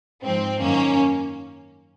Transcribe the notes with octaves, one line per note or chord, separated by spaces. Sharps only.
G#2 F3 C4
F#2 D#3 F#3 A#3 C#4